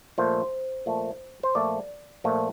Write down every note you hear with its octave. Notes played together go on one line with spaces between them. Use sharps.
A#2 F3 A3 C5
A#2 F3 A3
C5
A#2 F3 A3 D5
A#2 F3 A3